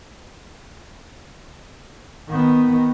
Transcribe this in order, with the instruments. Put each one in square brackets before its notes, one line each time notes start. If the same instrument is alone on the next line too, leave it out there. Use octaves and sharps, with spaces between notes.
[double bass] D#3 B3